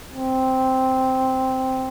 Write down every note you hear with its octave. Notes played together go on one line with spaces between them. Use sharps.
C4